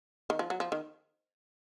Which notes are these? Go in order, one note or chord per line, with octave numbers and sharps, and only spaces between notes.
D#3
F3
F#3
F3
D#3